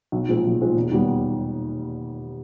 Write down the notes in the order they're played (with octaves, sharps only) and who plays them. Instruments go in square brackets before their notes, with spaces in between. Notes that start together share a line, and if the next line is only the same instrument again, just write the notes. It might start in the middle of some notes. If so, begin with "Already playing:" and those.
[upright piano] B1
A#2 F3 G#3 C4
B1
A#2 F3 G#3 C4
E1
D#2 D#3 G3 B3